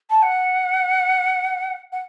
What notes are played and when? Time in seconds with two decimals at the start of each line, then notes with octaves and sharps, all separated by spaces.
0.10 A5
0.22 F#5
1.92 F#5